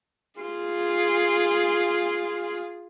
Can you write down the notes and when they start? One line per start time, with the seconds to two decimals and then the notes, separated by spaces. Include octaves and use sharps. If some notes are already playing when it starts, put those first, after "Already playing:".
0.40 F4 G#4